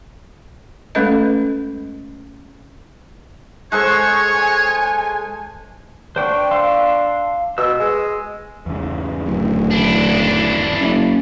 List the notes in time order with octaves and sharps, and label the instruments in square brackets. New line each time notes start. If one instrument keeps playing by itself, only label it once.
[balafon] G#3 A3 C#4 A4 B4 D#5
[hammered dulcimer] G#3 A4 C5 [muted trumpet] C#5 [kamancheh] C#6
[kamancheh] G#5
[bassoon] D4 [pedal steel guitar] C5 G5 C#6
[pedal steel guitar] F5 C6 E6
[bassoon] B2 [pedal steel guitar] E6
[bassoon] G#3
[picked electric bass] E2 G#2 C#3
[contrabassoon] D1
[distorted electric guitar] D4 E4
[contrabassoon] F#1 [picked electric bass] C#4